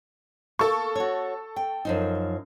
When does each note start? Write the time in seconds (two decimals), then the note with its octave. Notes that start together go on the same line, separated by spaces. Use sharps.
0.59 A#3 A4 C#6
0.96 F#4 C#5
1.56 G5
1.85 F#2 F3 D#4